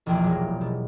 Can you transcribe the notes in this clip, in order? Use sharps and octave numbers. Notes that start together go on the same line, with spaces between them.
E1 A#1 E2 G5
F#3 G#3 G4
B2